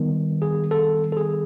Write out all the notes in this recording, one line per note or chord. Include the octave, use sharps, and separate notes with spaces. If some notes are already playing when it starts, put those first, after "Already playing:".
Already playing: D#3 G3 B3
G#4
A4
A4
G#4